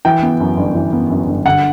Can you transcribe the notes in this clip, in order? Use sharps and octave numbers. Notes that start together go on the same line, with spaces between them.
E3 G5
B3
F#2
G1
E3
B3
F#2
G1
D3 F#5